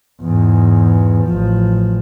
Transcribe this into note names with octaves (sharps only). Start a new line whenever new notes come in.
E2 G#2
A1 F3